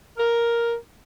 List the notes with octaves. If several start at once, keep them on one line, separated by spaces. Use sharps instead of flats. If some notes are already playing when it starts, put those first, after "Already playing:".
A#4